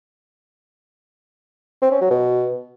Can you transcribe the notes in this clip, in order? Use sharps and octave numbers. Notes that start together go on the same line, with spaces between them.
C4
C#4
F#3
B2